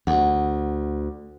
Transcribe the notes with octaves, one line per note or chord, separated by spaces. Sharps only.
D2 F#5